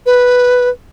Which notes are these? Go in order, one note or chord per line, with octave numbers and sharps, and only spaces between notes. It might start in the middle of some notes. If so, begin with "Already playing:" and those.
B4